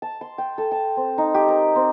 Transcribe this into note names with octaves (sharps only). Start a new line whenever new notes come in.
A5
C6
G5
A4
A5
C4
D#4
G4
A#4
C4